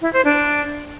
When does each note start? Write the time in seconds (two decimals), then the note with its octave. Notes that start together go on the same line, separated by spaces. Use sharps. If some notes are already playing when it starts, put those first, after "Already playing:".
0.01 E4
0.13 C5
0.25 D4